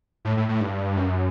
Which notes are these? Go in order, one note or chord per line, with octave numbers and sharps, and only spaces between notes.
A2
A2
A2
G2
F#2